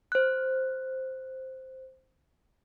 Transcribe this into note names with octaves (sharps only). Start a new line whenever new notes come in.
C5 F#6